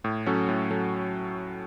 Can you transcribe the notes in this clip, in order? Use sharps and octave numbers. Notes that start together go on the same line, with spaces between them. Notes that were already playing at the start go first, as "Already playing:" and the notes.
A2
F#3 C#4 F#4 A4
A2
F#3 C#4 A4